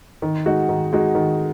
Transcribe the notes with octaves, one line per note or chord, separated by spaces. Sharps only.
D#3
G#3 D#4 F#4
D#3
G#3 D#4 F#4
D#3